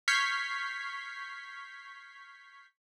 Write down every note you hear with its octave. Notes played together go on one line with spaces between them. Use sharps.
C#6 F6 G6 G#6 B6 C7